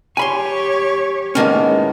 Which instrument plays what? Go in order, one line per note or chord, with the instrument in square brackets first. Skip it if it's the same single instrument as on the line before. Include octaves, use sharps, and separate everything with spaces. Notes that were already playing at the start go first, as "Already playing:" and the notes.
[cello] G4 C#5 [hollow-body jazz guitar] G#5 B5 C6
[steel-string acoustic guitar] A2 D#3 B3 [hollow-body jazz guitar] G#3 A#3 C#4